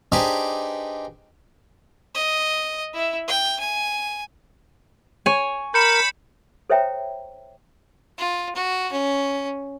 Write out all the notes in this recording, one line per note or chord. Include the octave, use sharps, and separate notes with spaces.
D4 D#4 G4 G#4 B4 C5
D#5
E4 E5
G5
G#5
C#5 G#5
A#4 B5 G6 C#7 E7
A4 C5 C#5 E5 G5 A#5
F4
F#4
C#4